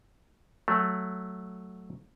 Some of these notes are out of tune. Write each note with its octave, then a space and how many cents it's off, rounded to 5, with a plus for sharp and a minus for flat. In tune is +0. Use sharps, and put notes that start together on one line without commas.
F#3 +0 A3 +0